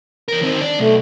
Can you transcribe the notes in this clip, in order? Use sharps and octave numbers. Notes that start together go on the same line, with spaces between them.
E2 A#4
D#3 C4
D4 D5
B1 A3